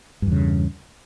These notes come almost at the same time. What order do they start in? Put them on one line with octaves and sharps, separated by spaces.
G2 E2 C#3